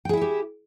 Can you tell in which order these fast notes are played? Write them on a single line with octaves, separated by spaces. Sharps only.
G5 G#4 E4 E5 G4